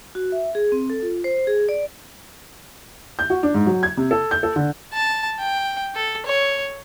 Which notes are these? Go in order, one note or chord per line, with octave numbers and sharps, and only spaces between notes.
F#4
E5
G#4
C4
A4
F4
C5
G#4
D5
G6
F#4
D4
G#2
F#3
G#6
C3
A4
G6
A4
D3
A5
G5
A4
C#5